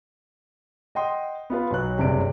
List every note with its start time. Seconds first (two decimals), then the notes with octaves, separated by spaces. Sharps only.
0.95 D#5 F#5 G5 C6 D#6
1.50 B3 F4 B4
1.70 B1 F#3 F#6
1.98 F#1 G2 C3 C#5 D7